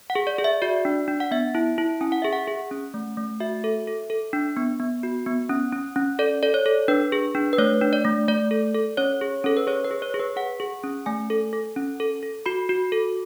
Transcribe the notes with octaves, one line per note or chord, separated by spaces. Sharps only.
F#5
G#4
D5
G#4
E5
F#4 D5
D4
D4
F#5
B3 E5
E4
E4
C#4 G#5
F#5
G#4 E5
F#5
G#4
C#4
A3
A3
F#4 E5
A4
A4
A4
D4
B3
B3
F#4
B3
C#4
C#4
C#4
A4 D5
A4 D5
C#5
A4
D4 B4
G#4
D4
B4
A3 C#5
D4
D5
A3
A3 D5
A4
A4
C#4 C#5
G#4
C#4 A4
B4
G#4 C#5
B4
G#4
C#5
G#4
B4
G#4 F#5
G#4
C#4
A3 G#5
A4
A4
C#4
A4
A4
F#4 B5
F#4
A4